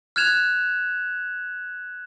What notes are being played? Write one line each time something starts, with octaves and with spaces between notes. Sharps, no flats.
F6 F#6 G#6 E7 F7